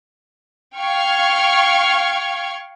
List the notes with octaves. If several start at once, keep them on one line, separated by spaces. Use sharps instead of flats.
F5 G5 C#6 F6 G#6